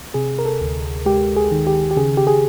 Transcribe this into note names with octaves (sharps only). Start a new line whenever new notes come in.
C3 G#4
A#4
A4
D2
G#3 G4
G#4
D#3
G4
G4
C#3 G#4
G4
G#4